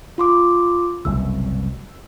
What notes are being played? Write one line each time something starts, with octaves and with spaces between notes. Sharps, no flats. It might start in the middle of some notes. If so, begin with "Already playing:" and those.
F4 C6 D6
F#1 C2 B2 E6